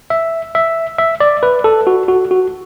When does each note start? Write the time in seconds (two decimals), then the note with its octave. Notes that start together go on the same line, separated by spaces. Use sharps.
0.10 E5
0.55 E5
0.98 E5
1.20 D5
1.43 B4
1.64 A4
1.87 F#4
2.08 F#4
2.31 F#4